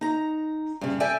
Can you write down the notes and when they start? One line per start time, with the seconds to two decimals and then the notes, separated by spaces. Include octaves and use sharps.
0.01 D#4 A#5
0.81 G2 C#3
1.00 A4 D5 E5 G5 G#5